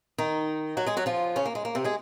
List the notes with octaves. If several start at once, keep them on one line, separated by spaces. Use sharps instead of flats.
D#3 D#4
F#3 F#4
G#3 G#4
F#3 F#4
F3 F4
C#3 C#4
A#3
G#3
A#3
C3 C4
G#3 G#4